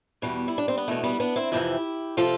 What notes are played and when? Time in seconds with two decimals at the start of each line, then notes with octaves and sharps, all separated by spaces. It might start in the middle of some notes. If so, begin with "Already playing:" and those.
0.22 E2 B2 G3
0.48 E4
0.58 D4
0.68 C4
0.78 B3
0.88 E2 B2 A3
1.03 G3 B3
1.20 B3 D4
1.36 C4 E4
1.52 F2 C3 E3 E4 G4
2.17 C3 F3 F4 A4